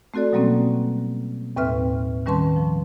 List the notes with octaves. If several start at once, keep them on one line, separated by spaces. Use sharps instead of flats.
A3 C4 F#4 A4 D5
B2 F#3 G3 A#3 C4 C#4
D#2 A2 C4 B4 E5 F6
D#3 G3 C#4 B4 A5 C6
F3